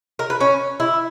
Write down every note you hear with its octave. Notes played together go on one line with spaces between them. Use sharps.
A#4
B4
C#4
E4